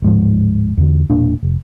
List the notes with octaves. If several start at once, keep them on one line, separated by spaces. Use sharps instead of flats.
D1 G#2 F3
E2 D3
E1 A#2 D4
F1